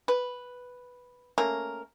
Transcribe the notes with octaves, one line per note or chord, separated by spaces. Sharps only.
B4
A3 A#3 C#4 A#4